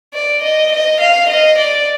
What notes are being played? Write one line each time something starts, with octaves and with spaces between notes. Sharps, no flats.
D5
D#5
D#5
F5
D#5
D5